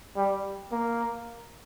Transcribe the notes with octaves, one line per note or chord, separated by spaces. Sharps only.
G3
A#3